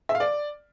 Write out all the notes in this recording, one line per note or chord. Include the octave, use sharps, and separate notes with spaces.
E5
F5
D5